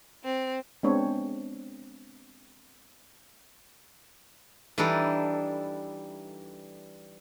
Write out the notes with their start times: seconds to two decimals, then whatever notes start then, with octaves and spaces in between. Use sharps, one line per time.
0.24 C4
0.83 G#3 B3 C4 D4 C#5
4.78 E3 G3 D4 D#4 A4